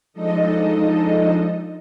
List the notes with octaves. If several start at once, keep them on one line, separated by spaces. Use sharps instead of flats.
F3 G#3 D4 D#4 A4 D#5